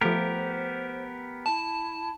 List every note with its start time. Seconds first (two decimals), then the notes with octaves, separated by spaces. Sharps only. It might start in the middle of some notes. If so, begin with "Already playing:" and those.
0.01 F3 A3 B3 G4 A#4 C5
1.46 E4 A5